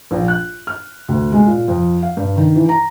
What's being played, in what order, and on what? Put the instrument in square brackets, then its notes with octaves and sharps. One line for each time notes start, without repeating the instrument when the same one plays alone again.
[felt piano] A#1
F#6
F6
D2
G#3
A#2
F2
F5
G2
D#3
E3
A#5